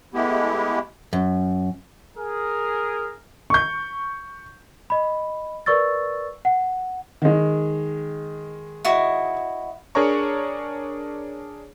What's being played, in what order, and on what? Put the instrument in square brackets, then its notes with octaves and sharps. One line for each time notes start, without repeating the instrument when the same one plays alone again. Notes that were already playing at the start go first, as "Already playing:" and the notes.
[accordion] G#3 A3 B3 E4 G4
[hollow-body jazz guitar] F#2
[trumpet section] G#4 A#4
[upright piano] C#6 G6
[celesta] D#5 B5
A#4 B4 D5 C#6 E6 A6
F#5
[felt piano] D#3 G#3
[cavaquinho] E4 F#4 D#5
[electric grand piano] D4 G#4 A#4 C#5 A#5 C#6